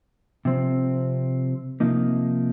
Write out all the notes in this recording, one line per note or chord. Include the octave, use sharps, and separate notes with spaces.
C3 F3 C4
C3 F3 A#3 D#4